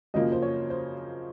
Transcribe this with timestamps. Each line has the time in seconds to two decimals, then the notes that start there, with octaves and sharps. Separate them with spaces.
0.14 F#2 C#3 F3 A#3 D#5
0.32 C5
0.42 C#5
0.70 C5